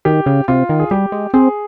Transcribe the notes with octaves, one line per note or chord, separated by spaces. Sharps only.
D#3 G4
C#3
C3 F4
D#3
G#4
G3 G4
G#3
C4 G#4